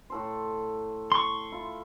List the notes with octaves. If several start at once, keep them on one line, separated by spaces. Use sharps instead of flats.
A2 A4 C5
C6 C#6
E4 F4